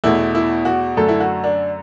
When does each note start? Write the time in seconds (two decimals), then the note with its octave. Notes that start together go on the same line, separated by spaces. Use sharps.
0.04 E2 B2 A3 E4
0.35 E4
0.65 F#4
0.97 F#2 D3 A3 A4
1.08 E4
1.20 F#4
1.44 D4